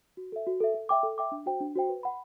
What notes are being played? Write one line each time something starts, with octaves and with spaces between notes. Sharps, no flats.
F#4
A4 E5
F#4
A4 E5
A4
E5 G5 D6
A4
E5 G5 D6
D4
F#4 C5 G5
D4
F#4 C5 G5
B4
F#5 B5